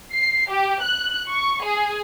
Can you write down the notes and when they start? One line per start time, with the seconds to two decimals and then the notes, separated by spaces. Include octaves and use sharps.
0.14 C7
0.50 G4
0.82 F#6
1.29 C#6
1.64 G#4